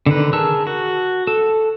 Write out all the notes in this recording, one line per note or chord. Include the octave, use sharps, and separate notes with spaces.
D3 D#3 B4
G#4 A#4 A5 E6
F#4
A4